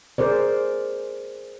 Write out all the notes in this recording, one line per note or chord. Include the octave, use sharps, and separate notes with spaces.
G#4 A#4 C5 D5